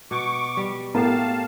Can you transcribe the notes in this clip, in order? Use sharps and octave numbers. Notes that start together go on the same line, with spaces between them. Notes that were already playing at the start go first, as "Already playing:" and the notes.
B2 C#6 D6
G3
A2 B3 G4 A#4 F5 A5